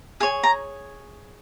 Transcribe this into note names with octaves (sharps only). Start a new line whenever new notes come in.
G#4 C#5 G#5
A#5